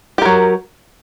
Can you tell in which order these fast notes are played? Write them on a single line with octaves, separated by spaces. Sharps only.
G4 A#4 F#3